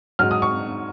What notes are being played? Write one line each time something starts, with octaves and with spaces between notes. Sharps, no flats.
G#2 F#3 F6
D#6
C#6